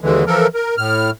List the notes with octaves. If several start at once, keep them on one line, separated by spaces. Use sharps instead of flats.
D#2 D3 E3 G#3
E3 F3 A4 A#4
A#4
A2 F6